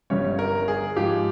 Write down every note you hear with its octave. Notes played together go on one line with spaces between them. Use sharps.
G1 G2 G3 C#4 C#5
A#4
G#4
G#2 F3 G#3 G4